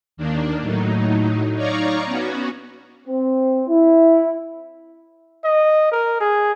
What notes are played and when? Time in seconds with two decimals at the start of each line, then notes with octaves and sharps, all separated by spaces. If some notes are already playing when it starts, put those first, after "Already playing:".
0.17 D#2 D#3 A#3 D4
0.61 A2 F#3 D#4
1.55 D#4 C#5 D5 F5 A#5 C#6
2.05 B3 C#4 F#4
3.06 C4
3.68 E4
5.44 D#5
5.92 A#4
6.21 G#4